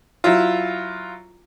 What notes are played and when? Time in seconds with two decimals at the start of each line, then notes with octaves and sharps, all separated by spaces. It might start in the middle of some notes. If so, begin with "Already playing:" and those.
0.24 F#3 E4 F4